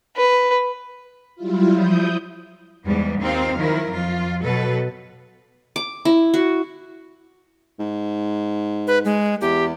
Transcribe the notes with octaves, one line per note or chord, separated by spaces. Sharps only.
B4
F#3 G3 E4 F4
F3 E4 D#6 G6
E2 G#2 G3 B3
D#2 C4 D#4 F4 C5 F5
D#3 F3 F#3 E4 A#4
F2 F3 F4
B2 F#3 A4 B4
D6
E4
F#4
G#2
B4
G#3
E2 G4